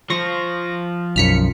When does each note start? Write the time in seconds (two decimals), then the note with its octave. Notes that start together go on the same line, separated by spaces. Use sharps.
0.10 F3 F4 C6 C#6 A#6
1.16 B1 F#2 F6 B6 C#7